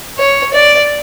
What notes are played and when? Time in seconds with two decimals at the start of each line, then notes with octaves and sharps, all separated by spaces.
0.18 C#5
0.53 D5